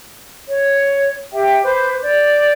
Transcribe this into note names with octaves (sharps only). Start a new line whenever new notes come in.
C#5
G4 E5 G5
B4 C5 D6 G6
D5 G6